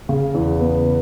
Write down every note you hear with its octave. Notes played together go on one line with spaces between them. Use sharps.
C#3
E2
B3